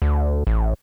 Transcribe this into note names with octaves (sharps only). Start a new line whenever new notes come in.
D2
A1